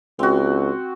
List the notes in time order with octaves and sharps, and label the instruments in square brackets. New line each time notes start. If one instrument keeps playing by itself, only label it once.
[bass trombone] C#2 [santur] C4 F#4